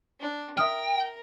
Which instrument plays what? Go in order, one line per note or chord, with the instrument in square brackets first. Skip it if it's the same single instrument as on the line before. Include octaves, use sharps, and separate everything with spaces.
[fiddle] D4
[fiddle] A#4 [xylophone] E5 D#6 F6 [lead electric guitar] G5